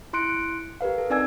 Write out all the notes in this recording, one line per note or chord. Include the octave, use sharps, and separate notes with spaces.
E4 C6 F#6 C#7 D7
G4 A#4 B4 F5
A4
C4 D#4 D5 G#5 E6 G#6